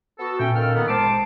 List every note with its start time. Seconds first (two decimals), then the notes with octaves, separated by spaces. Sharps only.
0.19 B3 F#4 A4
0.40 A#2 A3 C#4 G5
0.56 A#2 D#3 A4 F5 F6
0.75 D#3 B3
0.89 G1 G#3 C5 A5 D6 C7